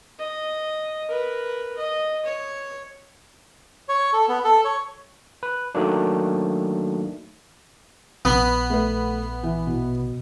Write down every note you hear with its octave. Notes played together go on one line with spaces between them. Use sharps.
D#5
A#4 B4
D#5
C#5
C#5
A4
B3
A4
C#5
B4
D#3 F#3 A3 A#3 D4
A#1 B3
A3 B4
E3
B2